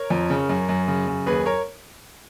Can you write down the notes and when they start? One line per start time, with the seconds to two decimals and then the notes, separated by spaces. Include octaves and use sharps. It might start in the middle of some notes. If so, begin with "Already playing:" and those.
Already playing: A#4 C#5
0.10 F2
0.30 C#3
0.49 F#2
0.69 F#2
0.88 C#3
1.07 F#2
1.26 D#2 G#4 B4
1.45 A#4 C#5